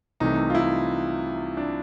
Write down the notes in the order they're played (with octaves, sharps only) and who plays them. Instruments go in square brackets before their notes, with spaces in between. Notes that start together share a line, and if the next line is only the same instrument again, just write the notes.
[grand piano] C2 C3 E3 A3 D#4
F4
E4
D4